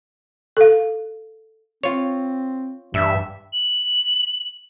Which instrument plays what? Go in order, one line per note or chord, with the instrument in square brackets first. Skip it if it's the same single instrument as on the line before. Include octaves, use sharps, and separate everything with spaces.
[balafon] A4 F5
[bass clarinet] C4 [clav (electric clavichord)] F4 C#5
[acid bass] G2 [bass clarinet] E3 [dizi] E5
[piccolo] F#7